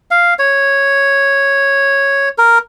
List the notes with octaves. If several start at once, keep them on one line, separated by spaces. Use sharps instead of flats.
F5
C#5
A#4